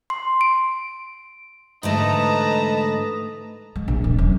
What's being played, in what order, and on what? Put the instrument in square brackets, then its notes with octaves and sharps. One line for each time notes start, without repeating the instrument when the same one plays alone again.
[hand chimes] C6
D7
[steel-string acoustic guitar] G#2 D3 A3 [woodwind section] E3 D#5 [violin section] B4 A5 A#5
[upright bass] G#3
A#1
E1
F#2